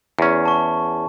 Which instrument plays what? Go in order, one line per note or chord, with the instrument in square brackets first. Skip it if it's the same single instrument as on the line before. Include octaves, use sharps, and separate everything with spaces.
[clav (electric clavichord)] E2 C#4
[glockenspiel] A5 C#6